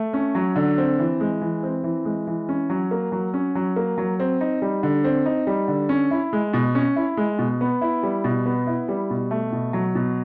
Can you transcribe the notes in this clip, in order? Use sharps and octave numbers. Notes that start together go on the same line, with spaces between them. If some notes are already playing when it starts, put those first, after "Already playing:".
Already playing: A3
C#4
F#3
D3
C4
E3
G#3
E3
C4
E3
G#3
E3
C#4
F#3
A#3
F#3
C#4
F#3
A#3
F#3
C4
D#4
G3
D3
C4
D#4
G3
D3
C#4
E4
G#3
B2
C#4
E4
G#3
B2
B3
E4
G3
B2
B3
E4
G3
B2
A3
B2
F#3
B2